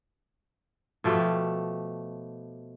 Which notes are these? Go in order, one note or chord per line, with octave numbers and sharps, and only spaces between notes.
B2 F3 A3 G4